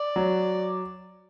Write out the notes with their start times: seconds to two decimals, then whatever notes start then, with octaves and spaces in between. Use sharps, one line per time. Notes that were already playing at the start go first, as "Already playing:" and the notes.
Already playing: D5
0.16 F#3